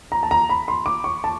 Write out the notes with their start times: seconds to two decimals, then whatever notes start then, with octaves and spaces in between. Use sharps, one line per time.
0.12 A#5
0.23 A5
0.31 A#5
0.50 B5
0.68 C6
0.86 D6
1.04 C#6
1.24 A5